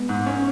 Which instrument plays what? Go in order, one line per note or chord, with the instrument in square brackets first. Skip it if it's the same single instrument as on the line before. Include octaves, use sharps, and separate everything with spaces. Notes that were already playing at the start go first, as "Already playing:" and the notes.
Already playing: [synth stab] G#3 B3
[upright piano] G#2
C#4